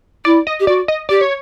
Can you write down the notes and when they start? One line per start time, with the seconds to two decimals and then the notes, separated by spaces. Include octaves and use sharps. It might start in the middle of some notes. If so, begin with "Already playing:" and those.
0.25 E4 D5
0.47 D#5
0.59 G4
0.67 F#4 D5
0.88 D#5
1.09 G4 D5
1.21 C#5